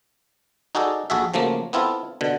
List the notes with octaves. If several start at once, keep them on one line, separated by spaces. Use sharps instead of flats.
D#4 F#4 G#4 A4 D5
A#1 F#4 G#4 A4 E5
C#3 F3 F#3 A3 A#3
B3 C4 E4 F4 A4
B2 D3